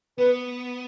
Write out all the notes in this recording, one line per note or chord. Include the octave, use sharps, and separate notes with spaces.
B3 B4